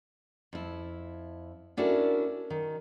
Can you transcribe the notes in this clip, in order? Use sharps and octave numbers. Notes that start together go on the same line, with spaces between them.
F2 E4
C#4 D4 E4 F#4 A4 A#4
D#3